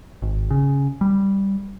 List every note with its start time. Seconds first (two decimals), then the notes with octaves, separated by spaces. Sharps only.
0.22 G#1
0.50 C#3
1.01 G3